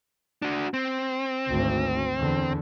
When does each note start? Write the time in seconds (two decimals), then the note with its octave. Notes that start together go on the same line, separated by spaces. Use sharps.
0.42 D4 F#4
0.74 C4
1.48 G#1 D2
2.18 E2 D3